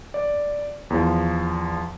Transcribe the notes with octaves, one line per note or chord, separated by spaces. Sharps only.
D5
E2 F3